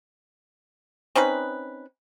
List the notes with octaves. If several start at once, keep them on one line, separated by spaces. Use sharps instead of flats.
C4 C#4 D#4 B4